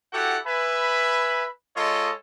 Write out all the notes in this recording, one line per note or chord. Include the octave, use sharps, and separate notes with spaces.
E4 F#4 G4 A4 F#5
B4 E5 G#5 B5
G#3 F4 A4 C#5 D#5